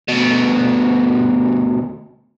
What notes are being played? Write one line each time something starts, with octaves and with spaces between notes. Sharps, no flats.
D2 B2